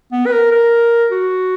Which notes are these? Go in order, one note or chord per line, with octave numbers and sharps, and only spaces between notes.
B3
B4
A#4
A#4
F#4